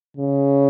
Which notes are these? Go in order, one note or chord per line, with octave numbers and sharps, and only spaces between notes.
C#3